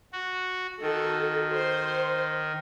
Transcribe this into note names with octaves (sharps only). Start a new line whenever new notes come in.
F#4
D#3 F#4 A4
C5